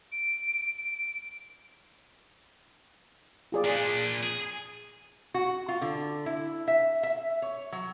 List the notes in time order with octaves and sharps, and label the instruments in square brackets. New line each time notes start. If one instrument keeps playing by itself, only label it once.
[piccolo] D7
[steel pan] F4 G#4 D5
[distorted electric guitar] A#2 D4
G#4
[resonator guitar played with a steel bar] F#4
F4
D3
E4
E5
E5
C#5
F#3